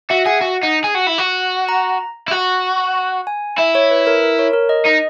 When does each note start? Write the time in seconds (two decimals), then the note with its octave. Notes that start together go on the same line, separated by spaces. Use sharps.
0.10 F#4 E5
0.26 G#4 F#5
0.41 F#4
0.63 D#4
0.84 G#4
0.95 F#4
1.07 E4
1.19 F#4
1.69 A#5
2.28 E4
2.31 F#4
3.27 G#5
3.58 E4 E5
3.75 C#5
3.91 B4
4.07 A#4
4.23 A#4
4.39 C#5
4.53 A#4
4.69 D#5
4.85 D#4 D#5